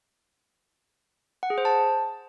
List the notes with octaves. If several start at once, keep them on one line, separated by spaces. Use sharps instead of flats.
F#5
G#4
C5
A5